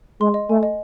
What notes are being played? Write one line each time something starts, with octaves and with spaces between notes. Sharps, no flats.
G#3 C6
D#5
A3 G#5
D#5